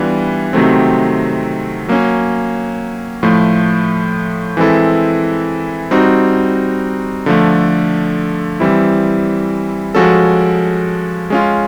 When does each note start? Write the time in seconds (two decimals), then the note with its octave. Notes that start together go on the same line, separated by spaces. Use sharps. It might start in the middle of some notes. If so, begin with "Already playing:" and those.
Already playing: E3 G3 B3 D4 F4
0.53 C3 D#3 F#3 A3 C4
1.88 F#3 A#3 C#4
3.23 A2 F3 A3
4.57 E3 G#3 C4 E4 A4
5.91 G3 C4 D#4 F#4
7.26 D3 F3 A3
8.60 E3 G3 C4 E4
9.95 F3 G#3 C#4 F#4 A4
11.30 G#3 C#4 F4